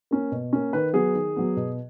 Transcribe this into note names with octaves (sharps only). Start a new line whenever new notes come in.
A#3 C#4
B2
A#3 C#4
D#3 B4
F#3 B3 G#4
D#3
F#3 B3
B2